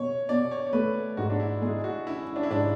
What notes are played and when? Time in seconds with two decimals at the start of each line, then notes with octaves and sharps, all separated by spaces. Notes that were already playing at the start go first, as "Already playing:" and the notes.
Already playing: B2 C#5
0.29 B2 D5
0.51 C#5
0.67 C#5
0.73 A3 B4
1.17 G#2 F#4
1.30 D4
1.40 E4
1.62 G#3 G#4
1.84 F#4
2.06 C#4 E4
2.36 D4
2.43 E4
2.50 G#2 D4